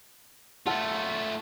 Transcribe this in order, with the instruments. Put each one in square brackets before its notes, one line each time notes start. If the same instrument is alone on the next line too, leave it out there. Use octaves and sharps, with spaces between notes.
[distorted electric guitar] A3 F4 [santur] A4 F#5